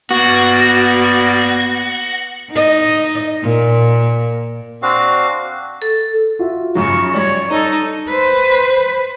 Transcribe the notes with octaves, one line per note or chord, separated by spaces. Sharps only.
G2 A#3 B3 F#4 D5
D#4 D#5
A#2
C4 D4 F#4 F5
A4
F4 F#4 E5
F#2 C#3 F#3 C#6
G3 C#5 D5
C#4 D#4 A4
B4 C5